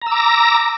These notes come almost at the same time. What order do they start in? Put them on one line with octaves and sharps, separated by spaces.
A#5 E6 D6 A#6